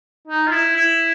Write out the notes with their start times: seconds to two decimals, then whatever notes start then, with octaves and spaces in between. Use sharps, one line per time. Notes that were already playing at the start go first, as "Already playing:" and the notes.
0.27 D#4
0.47 F4
0.52 E4
0.76 E4